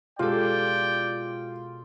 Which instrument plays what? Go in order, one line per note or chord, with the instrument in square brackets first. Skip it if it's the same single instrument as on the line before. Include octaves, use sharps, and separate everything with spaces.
[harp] B2 A4 [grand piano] G#3 G4 [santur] F4 [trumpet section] D5 G5